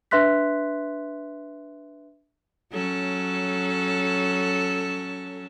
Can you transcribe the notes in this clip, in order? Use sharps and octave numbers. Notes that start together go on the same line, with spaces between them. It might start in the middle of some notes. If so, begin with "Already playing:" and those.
D4 B4 E5 C6 F#6 B6
F#3 C#4 A4